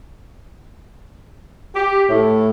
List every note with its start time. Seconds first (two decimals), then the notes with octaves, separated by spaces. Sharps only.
1.75 G4
2.09 A2